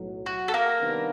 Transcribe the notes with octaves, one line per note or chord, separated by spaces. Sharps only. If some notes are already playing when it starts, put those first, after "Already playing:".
Already playing: B1 A2 F#3
F#4
A4
A#3 A#4
C3 D#3 G3 B3 D4